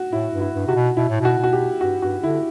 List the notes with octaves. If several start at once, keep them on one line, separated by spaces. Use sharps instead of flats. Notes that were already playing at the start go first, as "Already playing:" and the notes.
Already playing: F#4
A2 E4
G2
E4
G2
C3 F#4
B2
B2 E4
A2
B2 F#4
B2
F#4
G4
G2 F#4
G2 F#4
D3 E4